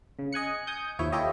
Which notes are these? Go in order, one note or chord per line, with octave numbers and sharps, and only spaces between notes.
C#3
D#5 G#5 F#6 C#7
G#5 D#6 G6
D#2 F3 E4 C#5
E4 F4 G4 A4 C#5 D#5